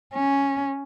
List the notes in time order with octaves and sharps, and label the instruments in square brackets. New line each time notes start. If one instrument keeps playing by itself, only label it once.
[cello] C#4